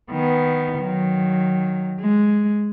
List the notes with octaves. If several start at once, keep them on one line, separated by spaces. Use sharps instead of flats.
D#3 B3
D#3 F#3
G#3